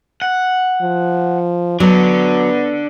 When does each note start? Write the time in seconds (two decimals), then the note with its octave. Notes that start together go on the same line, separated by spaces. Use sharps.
0.22 F#5
0.82 F3
1.80 F#3 B3 D4 A4